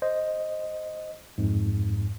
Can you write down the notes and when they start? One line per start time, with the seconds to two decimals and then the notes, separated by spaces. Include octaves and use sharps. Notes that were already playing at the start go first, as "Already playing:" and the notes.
0.02 C5 D#5
1.38 F2 G#2